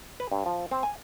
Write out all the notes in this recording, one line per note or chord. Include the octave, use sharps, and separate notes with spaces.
B4
G2
F3
C4
G#5